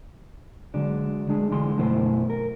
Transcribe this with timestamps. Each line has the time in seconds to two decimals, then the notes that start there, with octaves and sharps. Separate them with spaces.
0.74 D3 F#3 G#3 D4
1.29 G#3 D4 G#4
1.50 F2 D3 E3 G#3 C6
1.77 F#2 B2 A3 B3 E4 C5
2.30 A#4